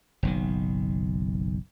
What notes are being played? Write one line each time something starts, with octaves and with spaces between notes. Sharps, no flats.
F#1 B1 D#3